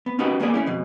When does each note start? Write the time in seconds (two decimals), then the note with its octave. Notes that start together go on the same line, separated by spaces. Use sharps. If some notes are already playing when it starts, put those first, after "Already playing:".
0.06 B3
0.19 C#4 D#4 F#4 G4 B4
0.40 G3 A#3 B3 G#4 D5
0.54 A3 C#4 E4
0.66 F2 B2